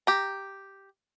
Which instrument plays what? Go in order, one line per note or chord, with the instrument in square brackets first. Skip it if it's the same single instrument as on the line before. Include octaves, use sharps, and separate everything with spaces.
[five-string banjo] G4 A#5